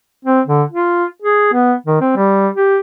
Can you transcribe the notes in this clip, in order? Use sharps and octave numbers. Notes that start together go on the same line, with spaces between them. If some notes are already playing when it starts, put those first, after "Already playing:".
C4
D3
F4
G#4
B3
D#3
C4
G3
G4